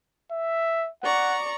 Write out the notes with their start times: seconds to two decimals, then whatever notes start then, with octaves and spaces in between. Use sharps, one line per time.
0.31 E5
1.03 D5 F#5 A#5 C#6